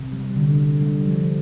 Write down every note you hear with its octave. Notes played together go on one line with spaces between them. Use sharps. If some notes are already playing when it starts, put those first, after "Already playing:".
Already playing: C3
G3
D3
D3
G3
F3